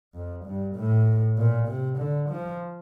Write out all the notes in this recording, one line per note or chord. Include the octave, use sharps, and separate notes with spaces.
F2
G2
A2
A#2
C3
D3
F3